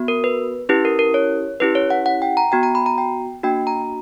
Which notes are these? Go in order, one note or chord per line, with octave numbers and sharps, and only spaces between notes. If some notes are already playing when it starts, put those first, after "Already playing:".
Already playing: B3 F#4
A#4
B4
C#4 E4 G4 B4
A#4
A#4
C#5
C#4 E4 G4 B4
C#5
F#5
F#5
G5
A#5
B3 F#4 G5
A#5
B5
A#5
G5
A#3 D4 F#4 G5
A#5